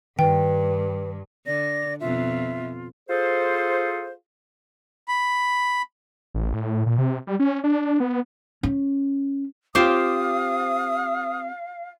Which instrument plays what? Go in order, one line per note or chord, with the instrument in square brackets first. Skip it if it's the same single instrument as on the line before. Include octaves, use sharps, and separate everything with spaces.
[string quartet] G2 [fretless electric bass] D#3 [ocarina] B4 [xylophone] G5
[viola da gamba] D3 [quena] D5 [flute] A#6
[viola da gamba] F2 B2 [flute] F4 [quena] E5
[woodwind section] F4 G#4 A4 C5
[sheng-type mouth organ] B5
[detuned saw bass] A1
A2
A#2
C3
G3
C#4
D4
B3
[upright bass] C#4
[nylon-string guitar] C4 F4 G4 [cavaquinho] C5 D6 [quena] F5 [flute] D#6